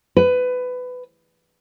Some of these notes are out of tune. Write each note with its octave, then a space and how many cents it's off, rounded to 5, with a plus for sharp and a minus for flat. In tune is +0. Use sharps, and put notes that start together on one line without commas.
B4 +20